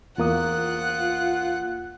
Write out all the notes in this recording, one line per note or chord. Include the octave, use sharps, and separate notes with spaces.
E2 A#3 F4 F#5 D#6 F#6